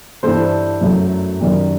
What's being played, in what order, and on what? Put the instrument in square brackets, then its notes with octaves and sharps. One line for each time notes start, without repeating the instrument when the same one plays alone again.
[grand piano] G2 E3 G3 A4 C5
F#2 F#3 A3
F#2 D#3 G3